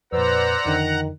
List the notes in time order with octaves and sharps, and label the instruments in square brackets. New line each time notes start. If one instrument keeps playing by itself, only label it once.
[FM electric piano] F2 A#2 [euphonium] B4 [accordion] C5 D5 E6 [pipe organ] F#5 A#5
[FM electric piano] F2 D3 [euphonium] D#3